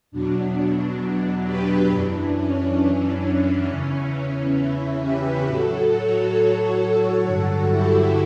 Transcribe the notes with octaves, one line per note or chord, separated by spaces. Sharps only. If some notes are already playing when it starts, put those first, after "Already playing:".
E2 B2 F#3 D4
G4 B4
F#2 E3 D4
C#4
D4
E2 C#3 E3 C#4
C#4 E4
G4 B4
A2 F#3 F#4 A4
A4 C#5
G2 D3 F#3 F#4 A4
E4 G4